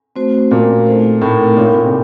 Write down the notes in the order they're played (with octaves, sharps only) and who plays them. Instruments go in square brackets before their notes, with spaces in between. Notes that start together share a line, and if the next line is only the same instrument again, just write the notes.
[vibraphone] A3 C4 F#4 C5
[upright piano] A#2 [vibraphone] A3 C#4 F#4 A#4 F5
[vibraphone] A3 C4 D#4 A4 C5
[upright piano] A2 [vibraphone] A3 C4 D#4 A#4
[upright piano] A#2 [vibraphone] D#4 A#4 C#5 F5
[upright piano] A2
A#2
C3